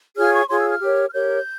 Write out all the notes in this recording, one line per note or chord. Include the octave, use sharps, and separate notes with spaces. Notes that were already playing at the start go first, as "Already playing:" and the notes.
F4 G#4 C#5 F6
C#6
F4 G#4 C#5 C6
E6
F6
G4 A#4 C#5
F6
G4 A#4 C#5 G6